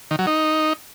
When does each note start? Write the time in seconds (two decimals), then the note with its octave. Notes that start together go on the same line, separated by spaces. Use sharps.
0.11 D#3
0.19 F#3
0.27 D#4